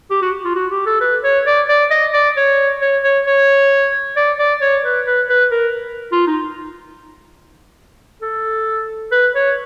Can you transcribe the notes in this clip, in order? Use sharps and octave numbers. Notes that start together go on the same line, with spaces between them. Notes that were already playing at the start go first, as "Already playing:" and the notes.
G4
F#4
F4
F#4
G4
A4
B4
C#5
D5
D5
D#5
D5
C#5
C#5
C#5
C#5
D5
D5
C#5
B4
B4
B4
A#4
F4
D#4
A4
B4
C#5